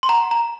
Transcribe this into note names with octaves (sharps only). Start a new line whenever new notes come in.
C6
F#5 A#5
A#5